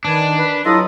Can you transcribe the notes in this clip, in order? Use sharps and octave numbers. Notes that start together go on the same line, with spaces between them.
D#3 D4 B4 D5 G#5
B4
G2 F#3 E4 F4 A4 D#5 D#6